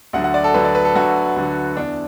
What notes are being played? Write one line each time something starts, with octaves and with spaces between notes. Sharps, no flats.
D2 D3 F#3 F#5
F#5
D5
A4
D2 D3 F#3 B4
D5
B4
A4
D2 D3 F#3 F#4
D2 D3 F#3
E2 E3 D4